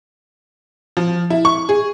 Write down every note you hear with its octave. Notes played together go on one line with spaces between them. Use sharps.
F3
E4
C#6
G#4